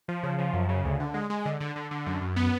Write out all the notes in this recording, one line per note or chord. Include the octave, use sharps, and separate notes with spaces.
F3
C#3
F3
F#2
C#3
D2
D3
G#3
G#3
D3
D3
D3
D3
F#2
F#2
B3